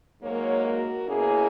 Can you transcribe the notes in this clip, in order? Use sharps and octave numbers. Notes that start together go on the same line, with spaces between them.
G#2 F#3 A#3 A#4 C#5
F#4 A#4
B2 A#3 C#4 E4 G#4